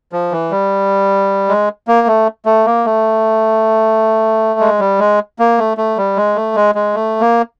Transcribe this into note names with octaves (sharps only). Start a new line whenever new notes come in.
F3
E3
G3
G#3
A#3
A3
A3
A#3
A3
G#3
G3
G#3
A#3
A3
A3
G3
G#3
A3
G#3
G#3
A3
A#3